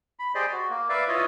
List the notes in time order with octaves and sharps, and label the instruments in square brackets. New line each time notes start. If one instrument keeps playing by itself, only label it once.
[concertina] B5
G4 G#4 C5 D5 D#5
F#4
A#3
B4 D5 E5 F5
E4 F4 B4 C#5 D#5